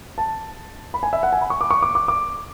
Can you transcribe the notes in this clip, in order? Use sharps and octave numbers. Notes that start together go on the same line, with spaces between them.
A5
B5
G#5
E5
F#5
G#5
B5
C#6
D6
C#6
D6
D6
D6